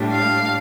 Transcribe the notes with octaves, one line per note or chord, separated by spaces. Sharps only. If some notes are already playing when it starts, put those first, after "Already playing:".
Already playing: A2 G3 D4
F5